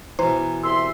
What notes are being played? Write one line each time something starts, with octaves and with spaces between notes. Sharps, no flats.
B2 E3 C5 A#5
C2 E5 C6 E6